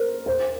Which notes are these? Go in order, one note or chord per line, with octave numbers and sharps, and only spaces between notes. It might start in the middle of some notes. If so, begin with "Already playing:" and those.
Already playing: A#4 C5
C5